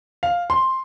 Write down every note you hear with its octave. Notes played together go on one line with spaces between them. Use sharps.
F5
C6